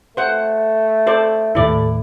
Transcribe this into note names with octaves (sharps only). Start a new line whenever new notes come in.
A3 C5 F#5
A4 C5 D5
D#2 A2 E4 A4 D5